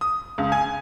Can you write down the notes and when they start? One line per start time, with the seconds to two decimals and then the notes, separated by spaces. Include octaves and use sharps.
0.01 D#6
0.38 C#2
0.52 G#5